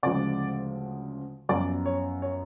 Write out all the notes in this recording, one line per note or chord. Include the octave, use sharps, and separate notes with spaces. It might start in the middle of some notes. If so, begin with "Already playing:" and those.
D2 C#3 F3 G#3 D5
F#2 F3 B3 D5
C#5
C#5